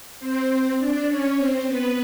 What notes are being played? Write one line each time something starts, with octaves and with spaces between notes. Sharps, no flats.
C4 C5
D4 D5
C#4 C#5
C4 C5
B3 B4